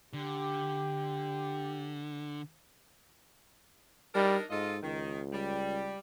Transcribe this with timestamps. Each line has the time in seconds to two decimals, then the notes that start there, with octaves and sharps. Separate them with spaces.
0.13 D3 G4
4.15 G3 D4 D#4 A#4
4.51 G#2 F4 A4 D#5
4.83 C#2 D#3
5.33 G3